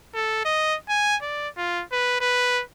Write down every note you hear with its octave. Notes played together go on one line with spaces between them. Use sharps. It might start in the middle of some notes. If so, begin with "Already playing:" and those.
A4
D#5
G#5
D5
F4
B4
B4